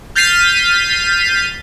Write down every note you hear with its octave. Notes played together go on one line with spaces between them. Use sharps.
F6 G6 A6 B6 C7 D#7